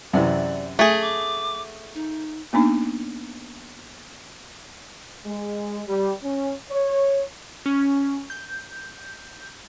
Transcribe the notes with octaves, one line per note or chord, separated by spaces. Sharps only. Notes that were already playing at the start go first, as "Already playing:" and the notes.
F#2 C3 E3 D5
A3 G#4 G#5
D6
D#4
A#3 B3 D4 D#4
G#3
G3
C#4
C#5
C#4
G6